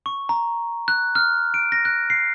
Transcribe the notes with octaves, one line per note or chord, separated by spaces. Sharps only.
C#6
A#5
F#6
F6
D7
A#6
F#6
C7